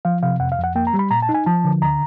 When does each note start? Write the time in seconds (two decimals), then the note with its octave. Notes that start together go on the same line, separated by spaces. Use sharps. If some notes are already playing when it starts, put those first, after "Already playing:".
0.05 F3 F5
0.23 C3 F5
0.40 F2 F#5
0.52 F5
0.58 F2
0.64 F#5
0.75 A#3 G5
0.87 A#5
0.94 G3
0.99 B5
1.10 A#2 A#5
1.22 A5
1.29 D#4
1.34 G#5
1.46 F3 A5
1.64 D3
1.82 D2 A#5